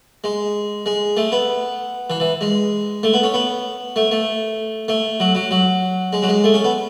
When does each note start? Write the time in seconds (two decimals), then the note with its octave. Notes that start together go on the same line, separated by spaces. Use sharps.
0.24 G#3
0.86 G#3
1.17 A3
1.32 B3
2.10 E3
2.20 E3
2.41 G#3
3.03 A3
3.13 B3
3.23 C#4
3.34 B3
3.96 A3
4.11 A3
4.88 A3
5.20 F#3
5.35 F#3
5.51 F#3
6.13 G#3
6.23 F#3
6.28 G#3
6.44 A3
6.54 C#4
6.64 B3